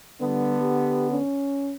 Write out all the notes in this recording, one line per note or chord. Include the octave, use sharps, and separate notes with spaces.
D3 G3 B3
G4
C#4